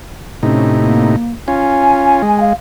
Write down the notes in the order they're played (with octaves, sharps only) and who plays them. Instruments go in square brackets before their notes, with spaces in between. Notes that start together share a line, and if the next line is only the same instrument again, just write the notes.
[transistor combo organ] A2 C3 D#4 [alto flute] C#4
[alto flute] A#3
[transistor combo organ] C#4 F4 [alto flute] G#5
[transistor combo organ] G#3
[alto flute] F5